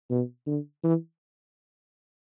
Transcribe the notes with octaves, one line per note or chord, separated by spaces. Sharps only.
B2
D3
E3